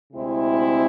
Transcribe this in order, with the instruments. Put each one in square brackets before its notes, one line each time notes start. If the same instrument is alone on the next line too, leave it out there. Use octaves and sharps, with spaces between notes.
[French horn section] D2 C3 G#3 C4 E4